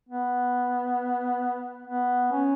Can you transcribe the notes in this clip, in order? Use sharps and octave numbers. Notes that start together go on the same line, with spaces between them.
B3
B3
C#4